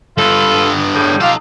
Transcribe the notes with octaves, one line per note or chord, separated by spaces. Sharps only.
G2 B3 F4 A4
A2 C#3 G3
D#4 F4 G4 A4 F5